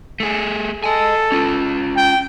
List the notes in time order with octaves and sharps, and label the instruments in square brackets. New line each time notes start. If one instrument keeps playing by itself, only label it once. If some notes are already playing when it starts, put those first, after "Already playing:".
[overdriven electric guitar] A3 G#4
[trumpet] A4 [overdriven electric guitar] D#5 G#5
[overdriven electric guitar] C#4 F4
[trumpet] G5